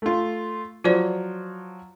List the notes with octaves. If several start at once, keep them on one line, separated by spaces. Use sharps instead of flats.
A3 F4
F3 F#3 F4 C5 D5